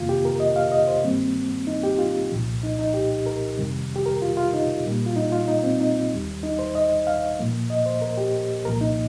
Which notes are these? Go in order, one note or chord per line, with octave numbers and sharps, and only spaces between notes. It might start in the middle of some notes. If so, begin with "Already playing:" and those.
Already playing: F2 C3 D#3 A#3 F4
G4
A#4
D#5
F5
D#5
C5
G2 D#3 G3 A#3 C4
D#4
G4
F4
C2 A#2 F3
D#4
D#4
G4
A#4
F2 C3 D#3 G3
G4
A#4
F4
F4
D#4
A#2 G3 A#3
F4
D#4
F4
D#4
C4
D#4
D#2 D#3 G3
D#4
C5
D#5
F5
A#2 F3 A#3
D#5
C5
A#4
G4
C2 A#2 F3 A#3 A#4
D#4